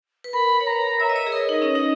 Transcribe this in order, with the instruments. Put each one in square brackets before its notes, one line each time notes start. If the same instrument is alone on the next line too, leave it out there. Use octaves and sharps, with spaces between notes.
[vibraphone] B4
[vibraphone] A#4 [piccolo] B5
[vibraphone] C#5
[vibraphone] B4 [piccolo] A#5
[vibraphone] C#5 [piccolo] E5
[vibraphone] D#5
C#5
G#4
[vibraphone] A#4 [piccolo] D#5
[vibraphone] D#4 [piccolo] D#5
[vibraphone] C#4
D#4